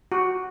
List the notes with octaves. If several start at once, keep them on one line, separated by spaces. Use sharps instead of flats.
F#4